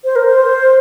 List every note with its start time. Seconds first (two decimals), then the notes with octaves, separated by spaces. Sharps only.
0.05 C5
0.16 A#4
0.27 C5